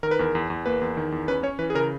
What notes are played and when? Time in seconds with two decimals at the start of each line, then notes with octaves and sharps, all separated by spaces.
0.03 D#3 A#4
0.11 B4
0.19 E2 A#4
0.35 E2
0.50 E2
0.66 A#3 B4
0.82 E2
0.97 D#3
1.12 E2
1.28 C#4 B4
1.43 C#4 C#5
1.59 E3 B4
1.70 G#4
1.75 C#3 A#4